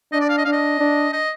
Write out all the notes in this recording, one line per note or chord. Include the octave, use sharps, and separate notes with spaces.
D4 D#5
D5
F5
D#5
D4 F5
D#5
D4
D#5